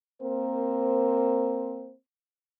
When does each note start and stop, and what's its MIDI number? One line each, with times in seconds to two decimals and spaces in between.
0.22 1.93 58
0.22 1.93 60
0.22 1.93 70
0.22 1.93 72